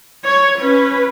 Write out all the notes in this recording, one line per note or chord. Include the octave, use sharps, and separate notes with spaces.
C#5
C#4 B4